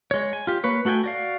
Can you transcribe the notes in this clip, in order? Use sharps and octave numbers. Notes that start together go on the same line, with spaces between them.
G#3 C#5
G#5
F4 G4
A#3 B4 C#5
A3 F#4 A4 G5 G#5
F#4 D5 F5